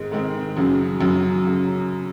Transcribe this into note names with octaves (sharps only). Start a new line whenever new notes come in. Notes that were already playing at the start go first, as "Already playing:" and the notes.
Already playing: G#2 D#3 G#3 C4
G#2 D#3 G#3 C4
F#2 C#3 F#3
F#2 C#3 F#3
C#3